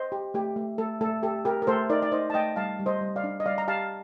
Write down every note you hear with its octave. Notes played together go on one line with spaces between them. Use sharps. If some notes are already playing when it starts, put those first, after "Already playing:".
Already playing: C5 D#5
G4
A3 G4
A3
A3 A4
A3 A4
G4 A4
G4 A#4
A#4
A3 A4 C5
D#4 A#4 D5
D5
D#4 C5 D#5
A5
A3 D#5 G5
G3 F5 A5
G3
C5 D#5
G3
D5 F5
D4
D#5
G3 D5 F5
A#5
G4 F5 A5